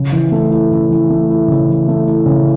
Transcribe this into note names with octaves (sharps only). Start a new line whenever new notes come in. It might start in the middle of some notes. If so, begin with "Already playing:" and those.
Already playing: C#3
E3
A3
E4
C#3
E3
A3
E4
C#3
E3
A3
E4
C#3